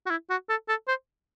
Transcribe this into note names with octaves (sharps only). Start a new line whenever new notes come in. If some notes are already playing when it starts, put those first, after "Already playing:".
F#4
E4
F#4
A4
A4
C5